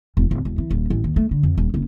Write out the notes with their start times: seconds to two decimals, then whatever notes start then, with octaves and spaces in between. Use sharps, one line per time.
0.17 E1
0.31 D1
0.45 E1
0.58 E3
0.71 D#1
0.90 A1
1.04 D#2
1.16 A3
1.31 D3
1.43 F2
1.58 D#1
1.74 F#1